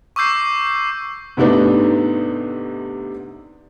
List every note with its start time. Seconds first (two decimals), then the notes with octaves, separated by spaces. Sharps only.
0.16 C#6 D6 E6 G6 C7
1.37 G#2 C3 A3 B3 D4 D#4